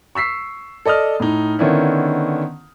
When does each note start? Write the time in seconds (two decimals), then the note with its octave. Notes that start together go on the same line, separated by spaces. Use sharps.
0.15 C#6 E6 B6 C7
0.85 A4 D5 D#5 D#6 F6
1.20 A2 D#4
1.59 D3 D#3 B3 C#4 D4 E4